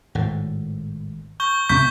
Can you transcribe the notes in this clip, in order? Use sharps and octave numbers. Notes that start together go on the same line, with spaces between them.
G#1 A2
C#6 G6 G7
C2 C3 B3 C#6 G6 B6